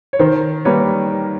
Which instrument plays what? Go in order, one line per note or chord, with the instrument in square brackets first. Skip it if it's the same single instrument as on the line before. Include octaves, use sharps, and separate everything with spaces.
[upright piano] C#5
[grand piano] D#3 [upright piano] A#4 C5
[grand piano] G3 A#3 [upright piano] B4 C#5